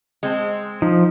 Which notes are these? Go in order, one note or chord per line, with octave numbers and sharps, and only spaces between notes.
G#3 C4
F3 D#4